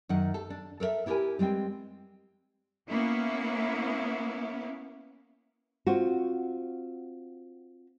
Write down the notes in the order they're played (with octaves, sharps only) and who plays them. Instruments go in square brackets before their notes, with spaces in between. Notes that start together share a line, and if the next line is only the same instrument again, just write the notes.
[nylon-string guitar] F#2 D#3 F#5
A4
D4
A4 A#4 C5 E5
B3 E4 G4 G#4 A#4 G#5
G3 G#3 C4 G5
[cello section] A#3 B3 C#4 E4
[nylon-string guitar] C4 F4 F#4